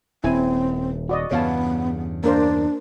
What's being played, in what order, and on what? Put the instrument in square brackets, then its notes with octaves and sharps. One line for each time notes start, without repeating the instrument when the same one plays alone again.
[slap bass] D#1 [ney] C4 [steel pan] E4 G#5
[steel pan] F#4 D5 D#5
[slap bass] E2 G2 C#3 [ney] B3 [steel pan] C#5 F5 A5
[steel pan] A#3 A#4 C5 [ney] D4